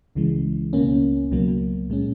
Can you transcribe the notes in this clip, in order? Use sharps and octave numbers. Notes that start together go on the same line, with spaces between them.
C#2 C#3 E3 G#3
C#2 B2 A#3 C#4
C#2 B2 F#3 A#3
A#2 G#3 C#4